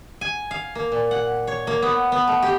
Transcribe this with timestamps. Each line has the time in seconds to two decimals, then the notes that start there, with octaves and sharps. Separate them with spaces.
0.21 G#5
0.51 F5
0.75 A#3
0.92 A#2
1.11 F#5
1.47 C#5
1.67 A#3
1.82 B3
2.12 B3
2.27 A3
2.42 G4